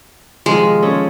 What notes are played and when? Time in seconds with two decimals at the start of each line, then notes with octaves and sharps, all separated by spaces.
0.46 C3 D#3 F3 G#3
0.82 C#4 G#4 A4